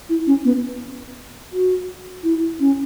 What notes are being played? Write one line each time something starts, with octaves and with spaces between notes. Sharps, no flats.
E4
C#4
B3
F#4
E4
C#4